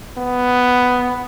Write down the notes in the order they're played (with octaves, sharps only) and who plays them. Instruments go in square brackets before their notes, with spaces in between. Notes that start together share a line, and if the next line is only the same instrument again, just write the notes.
[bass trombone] B3